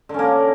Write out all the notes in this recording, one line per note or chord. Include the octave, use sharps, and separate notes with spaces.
D3 A#3 C#4